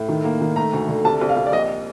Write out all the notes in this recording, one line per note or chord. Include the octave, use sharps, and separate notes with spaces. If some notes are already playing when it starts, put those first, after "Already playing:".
Already playing: A2
D#3
A#3
D#3
A3 A#5
D2
D3
C2 A5
C2
F5
C2
D5
A#1 D#5